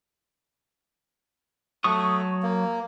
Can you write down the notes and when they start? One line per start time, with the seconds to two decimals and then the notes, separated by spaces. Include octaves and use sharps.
1.84 F#3 A3 C#6 D#6
2.43 A#3